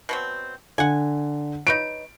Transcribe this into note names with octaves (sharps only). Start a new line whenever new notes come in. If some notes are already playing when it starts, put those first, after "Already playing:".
B2 F#3 C4
D3 F#5 G#5
D#4 B4 C#5 D7